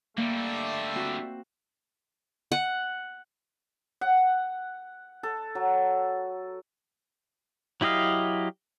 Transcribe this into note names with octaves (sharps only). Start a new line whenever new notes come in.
D3 G3 A3 A#3 D5 E5
C4 F#4
F#5
F#5
A4
F#3
F#3 E4 G4 D#5 F5